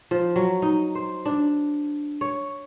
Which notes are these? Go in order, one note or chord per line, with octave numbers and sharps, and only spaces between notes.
F3
F#3
D#4
C5
D4
C#5